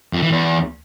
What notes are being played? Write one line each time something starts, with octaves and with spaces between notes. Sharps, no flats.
F2
E3
E2